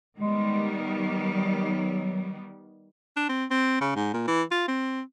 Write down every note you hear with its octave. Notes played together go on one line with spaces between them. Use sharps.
D#3 G3 G#3 B3
F#3
D4
C4
C4
C#3
G#2
A#2
E3
F4
C4